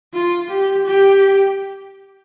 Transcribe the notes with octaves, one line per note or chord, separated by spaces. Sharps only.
F4
G4
G4